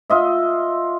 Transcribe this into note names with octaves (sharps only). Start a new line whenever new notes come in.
F4 D#5 E5